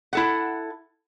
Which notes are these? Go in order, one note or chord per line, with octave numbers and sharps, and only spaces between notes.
E4 A4 F#5